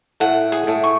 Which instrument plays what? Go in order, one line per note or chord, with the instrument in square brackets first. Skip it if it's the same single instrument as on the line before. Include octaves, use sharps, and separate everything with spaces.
[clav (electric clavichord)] A2 A3 [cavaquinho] F#5
[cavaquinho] G#4
[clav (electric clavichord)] A2 A3
[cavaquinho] C#6